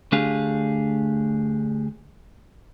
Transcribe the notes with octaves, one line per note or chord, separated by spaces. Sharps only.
D2 A3 D4 G4 G#4 F5